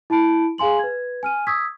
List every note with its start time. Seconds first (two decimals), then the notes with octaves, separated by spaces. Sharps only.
0.10 E4 A5 B5 D7
0.58 G#4 F5 G#5 C6 F#7
0.79 B4 G#6
1.23 G#5 F6 D#7
1.47 C#6 D#6 E6 G#6 B6